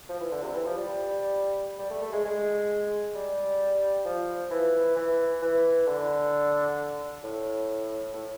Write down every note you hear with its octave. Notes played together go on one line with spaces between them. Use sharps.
F3
E3
D3
C3
E3
F3
G3
G3
A3
A3
G#3
G#3
G3
F3
E3
E3
E3
D3
A2
A2